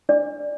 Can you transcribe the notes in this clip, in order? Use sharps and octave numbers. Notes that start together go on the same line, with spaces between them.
D4 D5